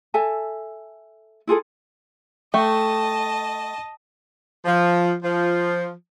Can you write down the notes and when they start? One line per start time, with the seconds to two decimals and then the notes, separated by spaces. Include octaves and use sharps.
0.14 A4 E5 G#5 A5
1.47 E4 F4 G#4 A4
2.54 A3 D#5 G5 A5 C#6
4.65 F3
5.22 F3